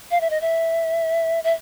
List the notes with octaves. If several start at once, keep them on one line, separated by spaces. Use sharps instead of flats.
F5
E5
D#5
E5
E5